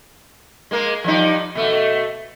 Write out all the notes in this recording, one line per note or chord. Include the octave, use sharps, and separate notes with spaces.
G#3 A#3 A#4
F3 G3 D#4
B2 A3